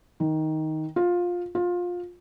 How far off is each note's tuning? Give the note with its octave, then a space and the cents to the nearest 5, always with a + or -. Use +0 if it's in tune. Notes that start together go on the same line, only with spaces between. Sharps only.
D#3 +10
F4 +15
F4 +20